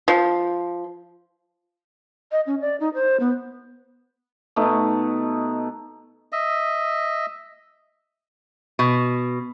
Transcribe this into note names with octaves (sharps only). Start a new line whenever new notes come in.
F3
D#5
C#4
D5
D#4
C5
B3
B2 A3 D#4
D#5 E5
B2